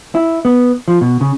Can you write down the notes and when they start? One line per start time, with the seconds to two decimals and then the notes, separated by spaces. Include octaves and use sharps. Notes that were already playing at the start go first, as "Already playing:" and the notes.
0.15 E4
0.45 B3
0.88 F3
1.01 B2
1.21 C#3